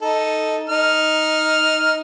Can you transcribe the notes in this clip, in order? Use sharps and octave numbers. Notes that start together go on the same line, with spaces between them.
D#4 A4
D#4 F6